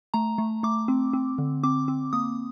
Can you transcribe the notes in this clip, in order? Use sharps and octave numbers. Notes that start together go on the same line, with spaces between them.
A3 A#5
A3
A3 D6
C4
C4
D3
C4 D6
C4
A#3 D#6